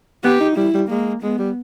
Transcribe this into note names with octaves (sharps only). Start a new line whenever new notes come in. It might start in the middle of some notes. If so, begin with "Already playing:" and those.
B3 G4
D#4
G3 E4
G3
G#3 A#3
G#3 B3
G3